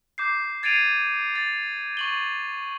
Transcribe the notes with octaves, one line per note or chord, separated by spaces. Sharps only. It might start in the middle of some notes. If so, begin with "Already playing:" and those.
D6 G6 C7
G#6 A6 C7 D7 D#7 F7
A6
C#6 F#7 G7